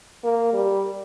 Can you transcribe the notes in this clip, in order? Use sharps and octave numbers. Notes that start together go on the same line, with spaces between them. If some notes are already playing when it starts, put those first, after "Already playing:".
A#3
G3